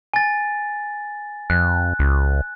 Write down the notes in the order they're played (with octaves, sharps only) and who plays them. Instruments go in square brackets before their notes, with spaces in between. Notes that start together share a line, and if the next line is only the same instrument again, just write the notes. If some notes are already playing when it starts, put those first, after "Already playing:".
[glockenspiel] G#5 A6
[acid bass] F2 [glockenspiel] F#6
[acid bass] C#2